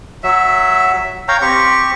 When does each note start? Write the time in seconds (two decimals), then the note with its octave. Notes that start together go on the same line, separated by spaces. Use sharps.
0.23 F#3 E5
1.28 C#5 F5 G5 A#5
1.42 C4 G4 C#6